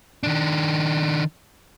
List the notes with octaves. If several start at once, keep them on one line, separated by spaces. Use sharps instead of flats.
D#3 D4